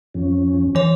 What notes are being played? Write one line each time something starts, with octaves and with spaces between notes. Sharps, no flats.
F2 F3 C#4
E3 C#5